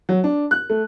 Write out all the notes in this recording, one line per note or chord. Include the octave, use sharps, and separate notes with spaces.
F#3
D4
F#6
A3